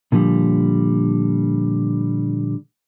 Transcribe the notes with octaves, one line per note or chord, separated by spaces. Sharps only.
A#2 D3 F3 G3